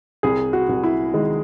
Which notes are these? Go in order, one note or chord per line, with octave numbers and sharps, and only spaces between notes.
C2 G#4
F#4
C2
E4
D#3 G#3